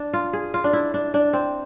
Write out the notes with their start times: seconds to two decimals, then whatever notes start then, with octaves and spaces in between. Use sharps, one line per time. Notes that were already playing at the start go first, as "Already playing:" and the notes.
Already playing: D4
0.14 F4
0.33 G#4
0.54 F4
0.64 D4
0.73 E4
0.94 D4
1.14 D4
1.33 C4